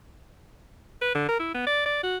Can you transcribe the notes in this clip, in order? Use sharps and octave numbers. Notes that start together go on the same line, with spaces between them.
B4
D3
A#4
E4
B3
D5
D5
F#4